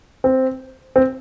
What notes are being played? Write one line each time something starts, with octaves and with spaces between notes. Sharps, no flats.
C4
C4